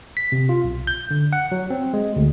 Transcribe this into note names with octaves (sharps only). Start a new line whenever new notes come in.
B6
C3
F4
B1
G6
D3
F#5
F#3
C4
G#3
D2